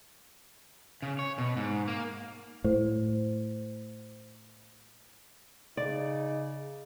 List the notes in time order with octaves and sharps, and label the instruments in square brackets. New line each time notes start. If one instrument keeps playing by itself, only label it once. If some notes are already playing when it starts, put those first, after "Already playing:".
[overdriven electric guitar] C#3
C#5
B2
G#2
A#3
[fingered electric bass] A2 [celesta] C5
[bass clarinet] C#3 [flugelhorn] D#4 [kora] D5